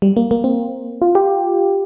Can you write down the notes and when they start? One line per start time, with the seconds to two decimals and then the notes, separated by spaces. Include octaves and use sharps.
0.02 G3
0.16 A#3
0.31 A#3
0.44 C4
1.02 F4
1.15 G4